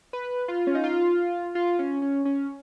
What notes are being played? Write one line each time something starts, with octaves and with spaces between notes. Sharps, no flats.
B4
F4
C#4
D#4
F4
F4
C#4
C#4
C#4